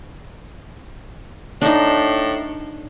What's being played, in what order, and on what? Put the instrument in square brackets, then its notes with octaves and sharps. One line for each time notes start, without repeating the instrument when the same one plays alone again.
[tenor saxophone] A2 [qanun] D4 D#4